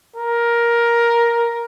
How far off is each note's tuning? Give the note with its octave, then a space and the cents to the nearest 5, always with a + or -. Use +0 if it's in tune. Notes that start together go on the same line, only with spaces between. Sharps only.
A#4 +10